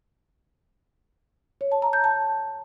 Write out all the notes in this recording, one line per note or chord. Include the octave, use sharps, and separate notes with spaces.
C#5
A5
A#5
G6
A5